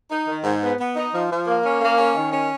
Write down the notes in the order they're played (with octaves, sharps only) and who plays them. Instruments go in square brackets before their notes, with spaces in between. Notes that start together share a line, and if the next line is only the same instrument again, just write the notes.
[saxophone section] D#4
D#3
G#2
B3
B3
D#4
F3
F3
A#3
C#4
A#3
C#4
D#3
C#4